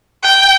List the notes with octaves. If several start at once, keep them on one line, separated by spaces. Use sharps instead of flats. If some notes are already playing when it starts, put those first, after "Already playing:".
G5